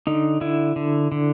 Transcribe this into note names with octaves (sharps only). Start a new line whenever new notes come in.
D3 D#4
D3 E4
D3
D3